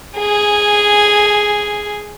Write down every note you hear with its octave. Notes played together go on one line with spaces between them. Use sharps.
G#4 G#5